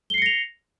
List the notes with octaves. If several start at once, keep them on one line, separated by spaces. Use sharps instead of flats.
A#6 C7 C#7 F7 G7